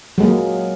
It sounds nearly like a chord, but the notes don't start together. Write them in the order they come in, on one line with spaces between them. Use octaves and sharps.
F#3 G#3 A#3